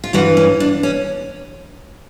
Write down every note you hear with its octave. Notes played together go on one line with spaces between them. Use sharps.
F4
G2 E3 F#4
C#4
D4
C#4